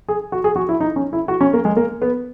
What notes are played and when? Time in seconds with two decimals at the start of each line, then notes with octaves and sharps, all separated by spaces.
0.09 G#4
0.32 F#4
0.44 G#4
0.56 F#4
0.69 E4
0.80 D#4
0.96 C#4
1.13 E4
1.28 F#4
1.41 C#4
1.53 A#3
1.65 G#3
1.76 A#3
2.02 B3